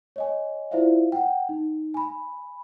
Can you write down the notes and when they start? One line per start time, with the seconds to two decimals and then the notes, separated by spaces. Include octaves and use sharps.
0.16 C#5 D#5 G#5
0.71 E4 F4 C5 D5 E5 F5
1.12 F#5 G5
1.49 D#4
1.94 G#5 B5